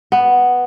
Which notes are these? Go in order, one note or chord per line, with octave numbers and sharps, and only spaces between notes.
B3